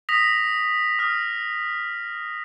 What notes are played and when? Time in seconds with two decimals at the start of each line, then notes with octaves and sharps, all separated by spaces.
0.09 D#6 A#6 B6 F7
0.99 D#6 F6